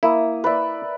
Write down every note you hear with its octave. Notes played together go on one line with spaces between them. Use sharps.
A#3 E4 D#6
B4 D5 E5